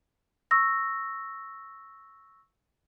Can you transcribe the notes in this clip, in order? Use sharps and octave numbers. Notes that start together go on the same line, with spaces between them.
C#6 E6 A#6